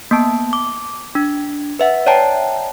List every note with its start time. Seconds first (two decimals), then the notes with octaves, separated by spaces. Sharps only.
0.11 A#3 B3 A5
0.53 D6
1.15 D4
1.79 B4 E5 F#5
2.06 C#5 D5 E5 G5 A5 A#5